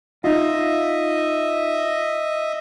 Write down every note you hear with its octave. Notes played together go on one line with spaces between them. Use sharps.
D#4 F4 D#5 E5